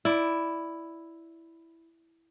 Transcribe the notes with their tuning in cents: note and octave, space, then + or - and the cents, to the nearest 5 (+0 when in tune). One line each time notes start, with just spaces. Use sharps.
E4 +0 D5 +0